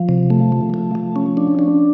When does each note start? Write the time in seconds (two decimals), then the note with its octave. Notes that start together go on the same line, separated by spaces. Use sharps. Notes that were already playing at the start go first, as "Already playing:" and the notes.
Already playing: F3
0.09 C3
0.30 A3
0.52 F3
0.74 A3
0.95 F3
1.16 C#4
1.37 D4
1.59 D4